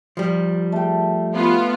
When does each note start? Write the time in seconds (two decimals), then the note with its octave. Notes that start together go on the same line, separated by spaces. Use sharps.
0.17 F3 G3
0.72 A3 G5
1.34 B3 F4